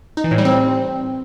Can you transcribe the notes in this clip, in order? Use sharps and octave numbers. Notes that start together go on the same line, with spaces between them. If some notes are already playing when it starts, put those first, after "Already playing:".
D#4
E3
A2
G3
C4